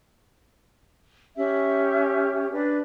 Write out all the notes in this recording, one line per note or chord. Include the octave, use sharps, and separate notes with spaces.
C#4 G4 E5
D4 B4